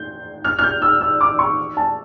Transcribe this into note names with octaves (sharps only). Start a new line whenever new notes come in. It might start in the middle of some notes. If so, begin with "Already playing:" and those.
Already playing: G6
F6
F6
G6
E6
E6
D6
C#6
A5